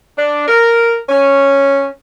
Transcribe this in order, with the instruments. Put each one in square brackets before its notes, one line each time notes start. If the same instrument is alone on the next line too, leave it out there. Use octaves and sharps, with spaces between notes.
[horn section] D4
A#4
C#4